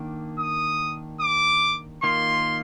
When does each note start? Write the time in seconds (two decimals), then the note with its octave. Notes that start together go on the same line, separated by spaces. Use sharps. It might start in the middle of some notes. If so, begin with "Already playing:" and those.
Already playing: D#3 A#3 D4
0.39 D#6
1.21 D6
2.03 D#3 A#3 F4 C6